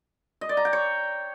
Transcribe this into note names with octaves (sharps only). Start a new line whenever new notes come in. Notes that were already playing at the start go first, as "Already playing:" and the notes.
D#5
D5
A#5
G5
C#5